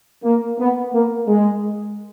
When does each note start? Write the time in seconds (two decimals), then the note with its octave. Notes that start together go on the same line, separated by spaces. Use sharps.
0.24 A#3
0.59 B3
0.93 A#3
1.28 G#3